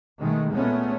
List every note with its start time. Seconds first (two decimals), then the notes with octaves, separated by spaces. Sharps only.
0.19 B2 D#3 G#3 A3
0.51 A#2 G#3 A3 B3 C#4